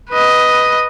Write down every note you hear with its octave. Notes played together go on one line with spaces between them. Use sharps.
B4 D#5